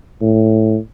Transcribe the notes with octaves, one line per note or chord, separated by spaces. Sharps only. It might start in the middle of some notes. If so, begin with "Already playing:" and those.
A2